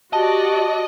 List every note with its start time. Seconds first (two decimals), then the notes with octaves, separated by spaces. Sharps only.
0.13 F#4 G4 D5 D#5 A5